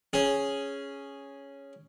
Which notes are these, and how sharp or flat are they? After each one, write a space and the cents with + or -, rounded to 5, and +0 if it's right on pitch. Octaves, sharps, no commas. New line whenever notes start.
C#4 +0 G#4 +0